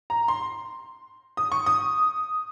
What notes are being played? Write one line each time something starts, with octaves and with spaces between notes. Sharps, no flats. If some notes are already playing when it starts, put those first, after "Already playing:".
A#5
C6
D#6
C#6
D#6